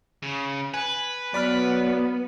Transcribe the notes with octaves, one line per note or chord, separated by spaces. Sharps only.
C#3
B4 G#5
F#3 B3 D5 B5 F6